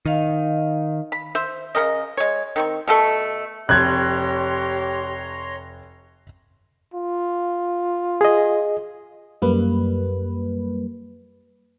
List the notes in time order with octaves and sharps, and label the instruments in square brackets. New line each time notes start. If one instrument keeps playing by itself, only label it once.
[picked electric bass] D#3 [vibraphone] D#5 F5
[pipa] B5
C5 E5
C#3 C4 A#4 D#5
G#3 C#5
D#3 C4 C#6
B2 A3 A4 C#6
[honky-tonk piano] F1 [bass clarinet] G4 [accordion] C#5 A#5 C6 [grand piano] F#6 G#6
[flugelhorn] F4
[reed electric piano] G#4 D#5
[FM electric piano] F#2 G3 A#3 B4